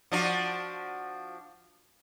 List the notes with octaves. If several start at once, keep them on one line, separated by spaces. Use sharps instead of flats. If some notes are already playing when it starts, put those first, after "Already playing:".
F3 D4 F#4